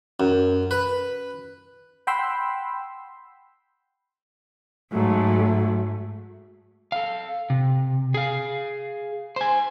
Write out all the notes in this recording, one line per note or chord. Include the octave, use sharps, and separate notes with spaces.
F#2
B4
F#5 G5 B5 C6 E6
G#2 F#3 A3
A4 F5
C3
G#4 F5
C5 G#5